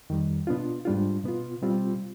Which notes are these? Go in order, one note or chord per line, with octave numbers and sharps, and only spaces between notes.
F2 D#3 G3
B2 B3 D4 F4
G#2 G3 D4 F4
B2 B3 F4
B2 G3 C4 F4